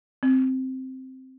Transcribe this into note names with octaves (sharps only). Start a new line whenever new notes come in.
C4